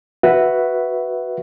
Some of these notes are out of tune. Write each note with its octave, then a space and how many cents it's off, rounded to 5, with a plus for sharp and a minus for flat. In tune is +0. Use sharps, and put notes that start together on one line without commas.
F#4 +0 B4 +0 E5 +0